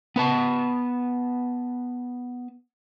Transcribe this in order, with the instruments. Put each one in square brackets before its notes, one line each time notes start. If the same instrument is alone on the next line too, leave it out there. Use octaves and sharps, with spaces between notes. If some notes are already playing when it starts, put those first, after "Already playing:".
[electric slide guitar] B3 B4 A5